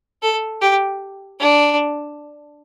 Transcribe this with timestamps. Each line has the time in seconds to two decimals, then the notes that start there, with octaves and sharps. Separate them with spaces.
0.22 A4
0.61 G4
1.40 D4